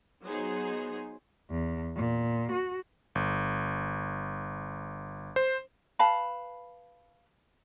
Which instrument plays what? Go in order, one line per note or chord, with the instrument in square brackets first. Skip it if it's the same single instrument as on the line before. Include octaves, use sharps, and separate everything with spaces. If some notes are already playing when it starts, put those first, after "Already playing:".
[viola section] F#3 B3 D#4 G#4 C5
[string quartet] E2
A#2
F#4
[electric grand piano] G1
C5
[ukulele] B4 F5 A5 B5